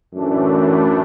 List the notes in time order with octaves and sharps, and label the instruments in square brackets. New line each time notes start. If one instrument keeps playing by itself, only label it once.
[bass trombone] F#2 [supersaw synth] A2 E3 A3 D4